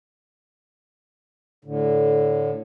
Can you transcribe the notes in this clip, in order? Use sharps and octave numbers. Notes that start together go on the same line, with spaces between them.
A2 D3